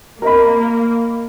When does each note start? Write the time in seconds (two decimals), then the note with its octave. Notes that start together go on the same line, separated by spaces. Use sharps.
0.22 A#3 A#4 D#5 B5